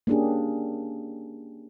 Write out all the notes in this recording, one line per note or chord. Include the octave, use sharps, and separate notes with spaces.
A#3 C#4 D4 G4 G#4